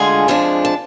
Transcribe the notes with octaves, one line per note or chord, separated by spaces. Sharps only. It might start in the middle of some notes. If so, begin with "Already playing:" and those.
Already playing: D2 D3 G#3 F4 G#4 G#5
F2 F3 G#3 D4
A5